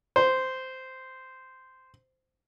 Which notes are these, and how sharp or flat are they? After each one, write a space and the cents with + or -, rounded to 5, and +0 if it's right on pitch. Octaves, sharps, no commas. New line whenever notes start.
C5 -10